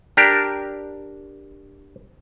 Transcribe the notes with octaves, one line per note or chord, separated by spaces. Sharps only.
D4 G4 A#4